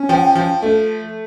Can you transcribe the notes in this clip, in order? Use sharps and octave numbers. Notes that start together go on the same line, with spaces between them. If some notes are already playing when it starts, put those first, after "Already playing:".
Already playing: C#4
F3 G5
F#5
G5
F3
A3